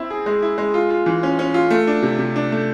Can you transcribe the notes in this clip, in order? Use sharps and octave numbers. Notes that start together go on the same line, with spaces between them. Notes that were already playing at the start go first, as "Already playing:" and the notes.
Already playing: C4 E4
G#4
G#3
E4
G#3
F4
F4
E3
C#4
C#4
F4
A3
D4
C3
C3
D4
A3